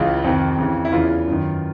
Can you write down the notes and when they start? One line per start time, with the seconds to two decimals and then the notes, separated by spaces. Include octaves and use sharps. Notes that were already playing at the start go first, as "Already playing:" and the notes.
Already playing: C#2 C#3 E3 F4
0.24 F2 C3 D#3
0.58 F2 C#3 E3
0.85 E4
0.93 E2 C#3 E3 F4
1.27 F#2 D#3